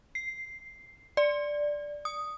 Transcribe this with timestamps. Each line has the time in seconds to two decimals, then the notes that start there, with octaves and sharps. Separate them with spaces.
0.15 C7
1.17 D5
2.05 D#6